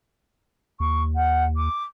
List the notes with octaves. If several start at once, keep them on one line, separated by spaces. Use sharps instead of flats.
D#2 C#6
F#5
D6